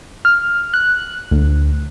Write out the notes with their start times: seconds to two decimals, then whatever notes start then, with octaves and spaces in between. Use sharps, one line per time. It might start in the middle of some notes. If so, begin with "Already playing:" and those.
0.25 F6
0.74 F#6
1.31 D2